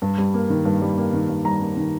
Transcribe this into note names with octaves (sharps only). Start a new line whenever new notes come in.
G2
G3
A#3
D#3
G2
G3
A#3
D#3
G2
G3 A#5
A#3
D#3